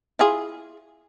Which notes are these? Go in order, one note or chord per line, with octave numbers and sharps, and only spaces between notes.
E4 F4 G#4